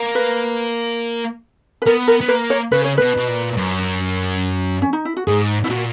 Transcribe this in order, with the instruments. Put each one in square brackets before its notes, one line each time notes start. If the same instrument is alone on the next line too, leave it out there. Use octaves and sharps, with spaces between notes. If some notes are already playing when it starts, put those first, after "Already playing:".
Already playing: [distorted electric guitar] A#3
[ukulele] B4
B4
[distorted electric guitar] B3 [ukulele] A#4
[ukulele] A#4
[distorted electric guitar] B3
[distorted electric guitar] A#3 [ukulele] B4
[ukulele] C#5
[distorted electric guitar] C#3 [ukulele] B4
[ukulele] C#5
[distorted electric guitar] B2 [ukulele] B4
[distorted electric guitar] B2
A#2
F#2
[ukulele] C#4
D#4
E4
F#4
[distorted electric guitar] G#2 [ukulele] G#4
[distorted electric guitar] B2 [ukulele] E4
[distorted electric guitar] A#2 [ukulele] F#4